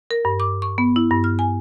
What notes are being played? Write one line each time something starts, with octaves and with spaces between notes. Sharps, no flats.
A#4
G2
D6
C#6
B3
E4
G2
F6
G#5